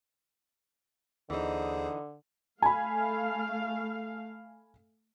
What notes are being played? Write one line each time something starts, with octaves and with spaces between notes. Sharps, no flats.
D#2 D3 E3 D#4 G#4 C5
A3 F5 G#5 B5